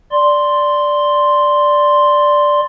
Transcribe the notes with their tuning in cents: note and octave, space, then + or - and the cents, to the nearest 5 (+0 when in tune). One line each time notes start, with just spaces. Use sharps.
D5 +0 C6 +0